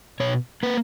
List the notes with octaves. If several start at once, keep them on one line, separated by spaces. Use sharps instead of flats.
B2 C#5
A#3 B4